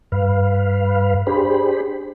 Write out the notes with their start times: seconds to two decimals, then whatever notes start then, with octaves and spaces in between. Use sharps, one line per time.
0.12 G2 B4 F5
1.27 D4 G4 G#4 C5 B5